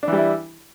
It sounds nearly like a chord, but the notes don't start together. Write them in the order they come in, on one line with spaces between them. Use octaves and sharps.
D4 E3 G3 E4